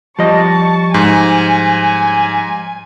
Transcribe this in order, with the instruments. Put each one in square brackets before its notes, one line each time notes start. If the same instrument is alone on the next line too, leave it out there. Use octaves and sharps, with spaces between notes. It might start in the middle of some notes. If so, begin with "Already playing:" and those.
[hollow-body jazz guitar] F3 G3 D#5 [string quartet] A5 C#6
[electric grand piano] G#2 [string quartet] G#5